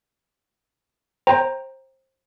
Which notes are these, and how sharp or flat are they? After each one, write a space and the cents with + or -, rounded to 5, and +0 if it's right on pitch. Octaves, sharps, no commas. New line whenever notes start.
C5 +25 G5 +0 A#5 +5